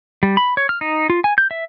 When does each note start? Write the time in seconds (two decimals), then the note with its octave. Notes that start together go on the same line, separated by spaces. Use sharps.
0.23 G3
0.37 B5
0.57 C#5
0.69 F6
0.81 D#4
1.10 F4
1.24 G#5
1.38 G6
1.51 E5